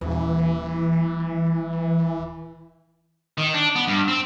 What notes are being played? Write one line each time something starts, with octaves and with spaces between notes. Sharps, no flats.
D#1 E3
D#3
D4
B3
G2
C4